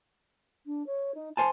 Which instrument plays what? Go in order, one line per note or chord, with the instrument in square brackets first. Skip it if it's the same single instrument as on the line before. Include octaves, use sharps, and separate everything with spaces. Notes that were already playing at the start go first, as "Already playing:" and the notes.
[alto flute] D4
C#5
D#4
[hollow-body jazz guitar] C5 G#5 A5 [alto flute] C6